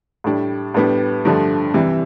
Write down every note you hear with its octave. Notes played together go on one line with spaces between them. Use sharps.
A2 G3 D4
A2 G3 B3 D4
G2 D3 F3 A3
C2 C3 E3